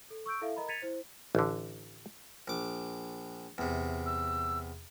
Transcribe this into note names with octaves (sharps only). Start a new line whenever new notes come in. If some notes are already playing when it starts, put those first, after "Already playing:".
A4
C#6 E6 G6 D7
E4 A4 E5 F5
A#4 D#5 A#5 B5
G#6 A6 B6 C#7 D#7 F7
E4 C5
A1 D3
A#1 D6
E2 C3
E6